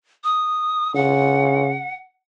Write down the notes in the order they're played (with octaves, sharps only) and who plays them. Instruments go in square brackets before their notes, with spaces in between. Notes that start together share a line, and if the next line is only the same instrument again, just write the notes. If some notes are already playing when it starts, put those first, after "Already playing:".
[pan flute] D#6
[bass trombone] C#3 [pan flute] F#5